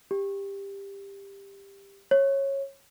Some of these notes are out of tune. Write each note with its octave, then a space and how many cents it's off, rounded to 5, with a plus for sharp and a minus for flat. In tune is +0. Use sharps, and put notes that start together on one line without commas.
G4 +15
C#5 -15